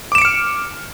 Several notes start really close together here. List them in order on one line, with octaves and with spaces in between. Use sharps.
D6 E7 D7 C#7 F6